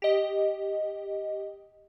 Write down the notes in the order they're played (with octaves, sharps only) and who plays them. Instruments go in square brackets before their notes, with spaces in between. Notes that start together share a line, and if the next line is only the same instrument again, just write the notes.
[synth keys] G4 D#5